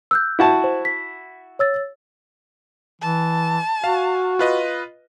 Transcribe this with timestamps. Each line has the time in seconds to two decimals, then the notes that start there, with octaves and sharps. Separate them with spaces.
0.11 E6 F#6 G6
0.39 E4 F#4 A5
0.64 C5
0.85 B6
1.59 C#5 E6 A6
3.02 E3 A5
3.84 F#4 F5
4.39 F4 B4 D#5